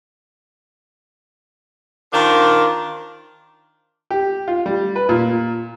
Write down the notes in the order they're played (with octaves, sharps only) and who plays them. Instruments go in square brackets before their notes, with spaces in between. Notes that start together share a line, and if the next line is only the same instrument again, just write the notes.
[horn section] D#3 D4 F4 A#4 C5
[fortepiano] G4
F4
G3
B4
A#2